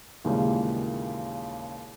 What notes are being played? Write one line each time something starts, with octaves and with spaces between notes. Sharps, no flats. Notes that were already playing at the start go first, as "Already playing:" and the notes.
D#2 A#2 C#3 E3 G3 G#3